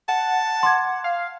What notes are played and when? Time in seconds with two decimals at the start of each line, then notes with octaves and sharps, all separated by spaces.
0.09 F#5 A5
0.63 C6 D6 G#6
1.04 F5